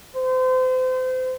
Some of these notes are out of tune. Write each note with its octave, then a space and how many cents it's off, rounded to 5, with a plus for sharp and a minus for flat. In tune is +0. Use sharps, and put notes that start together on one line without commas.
C5 -35